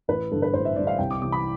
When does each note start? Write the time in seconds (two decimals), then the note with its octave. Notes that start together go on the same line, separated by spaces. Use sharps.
0.08 A1 B4
0.31 G2 D3 A4
0.42 B4
0.53 A1 C5
0.65 E5
0.76 G2 D3 D5
0.87 F5
0.99 C2 G5
1.11 D6
1.22 C3 E3 D6
1.32 B5